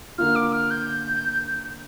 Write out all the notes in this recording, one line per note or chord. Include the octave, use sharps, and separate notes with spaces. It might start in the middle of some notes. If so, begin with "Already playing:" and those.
D3 A#3 F4 F6
D6
F6
G6